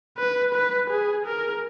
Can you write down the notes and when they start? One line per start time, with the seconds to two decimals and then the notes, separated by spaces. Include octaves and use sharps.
0.18 B4
0.55 B4
0.90 G#4
1.26 A#4